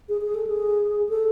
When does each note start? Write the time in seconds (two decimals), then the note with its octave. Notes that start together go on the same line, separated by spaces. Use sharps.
0.09 G#4
0.21 G#4
0.35 A4
0.47 G#4
1.09 A4